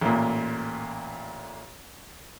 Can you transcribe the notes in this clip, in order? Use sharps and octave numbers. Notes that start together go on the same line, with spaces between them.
A1 A#2